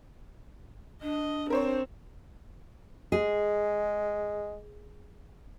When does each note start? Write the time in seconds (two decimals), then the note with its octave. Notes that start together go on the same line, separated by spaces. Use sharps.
1.02 D4 D#5
1.50 C4 A#4 C5 C#5
3.12 G#3 G#4